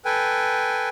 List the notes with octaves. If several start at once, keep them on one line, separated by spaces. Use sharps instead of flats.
A4 B4 G5 G#5